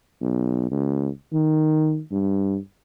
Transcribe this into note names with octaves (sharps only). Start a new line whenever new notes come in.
B1
C#2
D#3
G2